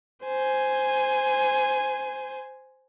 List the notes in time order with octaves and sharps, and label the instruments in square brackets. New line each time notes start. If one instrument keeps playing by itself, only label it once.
[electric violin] C5 G#5